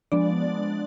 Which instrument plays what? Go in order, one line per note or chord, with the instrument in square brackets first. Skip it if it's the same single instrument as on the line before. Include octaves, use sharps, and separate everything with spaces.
[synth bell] F3 G#3 B3 D4 D5